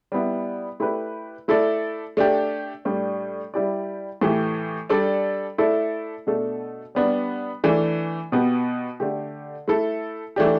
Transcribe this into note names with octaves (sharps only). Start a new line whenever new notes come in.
G3 B3 E4
A3 E4 G4 B4 D5
A3 E4 A4 D5
A3 D4 G4
A2 G3 D4
G3 E4 G4 D5
A2 E3 A3 G4
G3 D4 A4 D5
A3 E4 A4 D5
B2 A3 D4 A4
G3 B3 D4
E3 A3 D4
B2 B3 G4
D3 A3 G4
A3 E4 A4
E3 A3 D4 G4